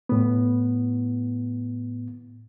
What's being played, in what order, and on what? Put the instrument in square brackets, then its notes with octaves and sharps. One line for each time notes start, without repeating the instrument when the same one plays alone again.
[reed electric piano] A2 B3